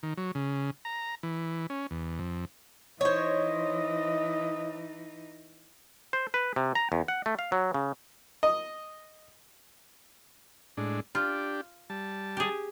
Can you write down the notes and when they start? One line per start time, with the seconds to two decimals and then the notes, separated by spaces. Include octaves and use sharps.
0.03 D#3
0.17 F#3
0.35 C#3
0.85 A#5
1.23 E3
1.70 C#4
1.91 E2
2.19 F2
3.01 E3 D#4 C5 C#5 D#5
6.13 C5
6.34 B4
6.56 C3
6.75 A#5
6.92 E2
7.08 F#5
7.26 A3
7.39 F5
7.52 F#3
7.74 C#3
8.43 D#5
10.77 A2 G#3 D4
11.15 D4 F4 G4
11.90 G3 A5
12.37 G4 G#4